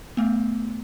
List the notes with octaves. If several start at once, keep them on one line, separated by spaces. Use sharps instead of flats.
A3 B3